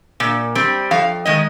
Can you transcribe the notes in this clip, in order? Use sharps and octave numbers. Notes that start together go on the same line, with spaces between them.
A#2
G3 C4
F2 F5
D#3 G#3 D#5